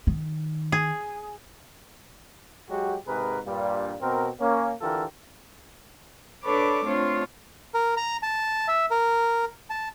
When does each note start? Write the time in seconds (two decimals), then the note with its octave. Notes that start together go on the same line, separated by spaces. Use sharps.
0.07 D#3
0.72 G#4
2.70 F#3 G#3 F#4 G4
3.08 G#2 C3 G#4 A#4 B4
3.46 G2 A#2 G3
4.01 B2 C4 A#4
4.41 A#3 C#4
4.81 D3 E3 F4 G4 A4 A#4
6.44 D4 A4 B4 C#5 D5 D6
6.85 A3 C4 D4 F4 C#5
7.74 A#4
7.97 A#5
8.23 A5
8.68 E5
8.90 A#4
9.70 A5